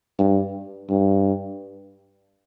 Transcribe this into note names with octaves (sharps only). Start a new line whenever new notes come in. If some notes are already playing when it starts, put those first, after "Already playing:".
G2
G2